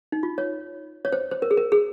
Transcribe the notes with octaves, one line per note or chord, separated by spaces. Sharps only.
D#4
F4
C#5
C#5
C5
C5
A#4
G#4
A#4
G#4